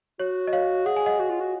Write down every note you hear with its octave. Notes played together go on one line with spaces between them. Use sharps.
F#4 C#5
D#5
C#5 F5
G#4 F#5
G#5
D#5 F#5
F#4
F4
F#4